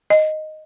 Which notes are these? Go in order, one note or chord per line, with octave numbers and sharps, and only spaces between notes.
D#5